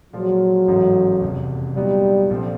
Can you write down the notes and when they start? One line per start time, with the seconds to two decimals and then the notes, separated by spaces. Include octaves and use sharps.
0.13 A#2 F3 F#3 G#3
0.68 A1 G#2 E3 A3 C#4
1.22 F1 E2 C#3
1.76 A#2 F#3 G3 B3 D#4
2.30 A#1 A#2 F3 A3 C4